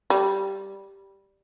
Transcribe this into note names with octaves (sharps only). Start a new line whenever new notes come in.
G3